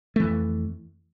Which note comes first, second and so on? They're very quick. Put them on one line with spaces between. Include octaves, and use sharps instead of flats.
A3 E3 F2